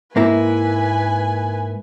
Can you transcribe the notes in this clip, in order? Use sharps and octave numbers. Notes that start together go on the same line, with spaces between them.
G#2 A#3 E4 B4 G#5